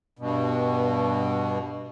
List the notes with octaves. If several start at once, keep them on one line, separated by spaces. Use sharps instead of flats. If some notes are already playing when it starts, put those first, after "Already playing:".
G2 B2